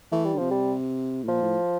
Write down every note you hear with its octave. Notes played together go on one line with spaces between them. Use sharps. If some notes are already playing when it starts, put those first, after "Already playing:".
E3 A3
G3
D3
C3 F3
G3
A2
A#2 F3
A2